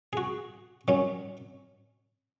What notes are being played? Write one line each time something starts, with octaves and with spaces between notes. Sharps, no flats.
G#4
F#4
D#3 F#3 C#4